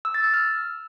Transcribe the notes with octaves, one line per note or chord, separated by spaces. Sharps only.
E6
A6
E6
F6